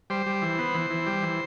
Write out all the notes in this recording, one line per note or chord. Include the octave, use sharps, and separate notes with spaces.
G3 C5
G3
E3
B3
E3
E3
G3
E3